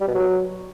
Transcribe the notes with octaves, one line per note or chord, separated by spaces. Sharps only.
G3
B2
F#3